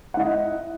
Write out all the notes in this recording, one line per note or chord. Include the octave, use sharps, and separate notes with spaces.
E4 D#5 F#5